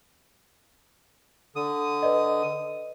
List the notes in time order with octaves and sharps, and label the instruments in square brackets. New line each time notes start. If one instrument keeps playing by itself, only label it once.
[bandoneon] D3 D#6
[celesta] B4 D5 D#5